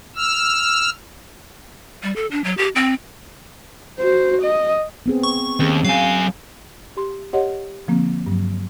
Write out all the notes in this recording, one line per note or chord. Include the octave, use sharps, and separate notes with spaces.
E6 F6
G3
A4
D4
F#3
G4
C4
F#4 C5
D#5
B3 C4 G#4
C#6
D#2 C4 C#4 G#4
F#3 F5 G#5
G4 C6
G4 C#5 D#5 F#5 C6
D3 F3 A#3 C4
G2 F#3